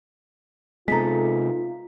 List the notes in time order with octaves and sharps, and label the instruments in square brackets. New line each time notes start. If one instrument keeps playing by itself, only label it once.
[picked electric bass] C3 G#3 [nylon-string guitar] B3 D#4 A4 [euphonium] F4 [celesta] A#5 B6